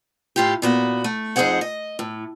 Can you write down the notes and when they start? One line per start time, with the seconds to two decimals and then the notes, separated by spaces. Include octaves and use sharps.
0.36 A2 F4 G4
0.62 A#2 B3 F#4
1.04 A3
1.36 F2 D#4 G#4 C5 C#5 F#5
1.61 D#5
1.99 A2